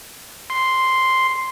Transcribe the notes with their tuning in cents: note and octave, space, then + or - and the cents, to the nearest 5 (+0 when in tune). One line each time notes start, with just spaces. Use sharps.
C6 +0